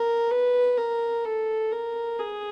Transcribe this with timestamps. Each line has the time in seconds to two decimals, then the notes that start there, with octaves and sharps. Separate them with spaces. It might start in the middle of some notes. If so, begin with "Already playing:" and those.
Already playing: A#4
0.31 B4
0.78 A#4
1.25 A4
1.72 A#4
2.19 G#4